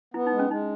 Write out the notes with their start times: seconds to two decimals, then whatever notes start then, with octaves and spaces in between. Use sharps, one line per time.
0.14 B3 E4
0.27 D#4
0.32 G#3
0.39 C#4
0.50 G#3 D#4